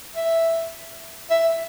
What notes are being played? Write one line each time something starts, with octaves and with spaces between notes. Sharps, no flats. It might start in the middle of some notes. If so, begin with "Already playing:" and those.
E5
E5